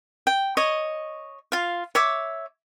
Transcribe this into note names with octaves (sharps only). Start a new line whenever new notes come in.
G5
C#5 D#5
F4 F5
C#5 E5 D6